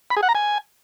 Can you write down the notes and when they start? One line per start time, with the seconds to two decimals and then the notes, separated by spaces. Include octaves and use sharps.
0.11 B5
0.17 G#4
0.23 F#5
0.29 A#5
0.35 G#5